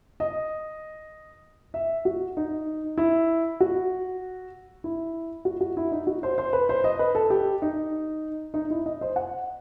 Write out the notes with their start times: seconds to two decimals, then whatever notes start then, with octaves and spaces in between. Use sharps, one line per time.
0.20 D#5
1.74 E5
2.05 F#4
2.37 D#4
2.98 E4
3.60 F#4
4.84 E4
5.45 F#4
5.61 F#4
5.77 E4
5.92 D#4
6.07 F#4
6.23 C5
6.38 C5
6.53 B4
6.69 C5
6.84 D#5
6.99 B4
7.15 A4
7.30 G4
7.62 D#4
8.54 D#4
8.70 E4
8.86 D#5
9.01 C5
9.16 F#5